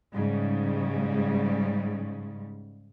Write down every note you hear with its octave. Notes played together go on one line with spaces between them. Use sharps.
G#2 C#3 G3